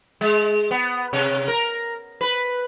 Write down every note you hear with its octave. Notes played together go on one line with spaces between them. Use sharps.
G#3
B3
C3
A#4
B4